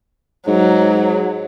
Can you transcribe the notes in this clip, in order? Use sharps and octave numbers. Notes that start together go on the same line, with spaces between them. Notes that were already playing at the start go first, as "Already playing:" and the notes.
G#2 F#3